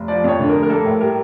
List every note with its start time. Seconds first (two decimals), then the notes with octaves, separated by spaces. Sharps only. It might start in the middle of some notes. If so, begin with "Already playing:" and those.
Already playing: F1
0.08 F3 D5
0.24 F2 C#5
0.39 D3
0.49 A#4
0.55 F1
0.63 A#4
0.70 A#3 A4
0.85 A2
1.01 G3 A#4